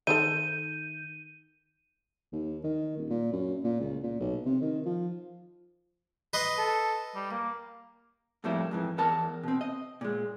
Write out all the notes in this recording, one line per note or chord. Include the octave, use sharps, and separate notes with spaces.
D#3 A4 C5 E5 G6 D#7
D#2
D#3
D#1
A#2
F#2
A#2
C#2
A#2
B1
C3
D#3
F3
B4 D#5 C6
A4
G3
A#3
F2 A2 G3 A#3 E4
F2 G#2 E3
E2 A#4 A5
B2 C4
D#5
A#2 G#3